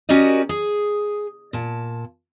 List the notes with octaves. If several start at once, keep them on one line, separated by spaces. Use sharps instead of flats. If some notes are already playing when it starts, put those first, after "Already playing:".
C#4 F#4 G4 A#4 D5 D#5
G#4
A#2 A5